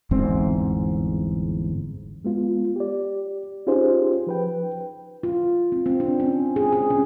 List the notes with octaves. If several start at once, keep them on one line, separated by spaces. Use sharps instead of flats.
G1 E2 G#2 C4
G#3 B3 F4
G4 D5
C#4 D#4 F4 G4 G#4 C5
F3 B4 G5
F4
C4
C4
D4
C#4
G#4
G#4
C#4